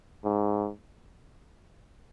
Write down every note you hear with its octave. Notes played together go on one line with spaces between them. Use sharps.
G#2